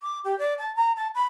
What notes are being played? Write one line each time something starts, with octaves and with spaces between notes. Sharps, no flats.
D6
G4
D5
A5
A#5
A5
B5